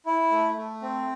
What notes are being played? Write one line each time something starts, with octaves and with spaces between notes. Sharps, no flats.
E4
A3
A3
C4